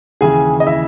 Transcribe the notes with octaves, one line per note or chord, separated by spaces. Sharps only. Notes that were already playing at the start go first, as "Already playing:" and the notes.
D#2 C#3 E3 G#4 G#5
D#5
E4 E5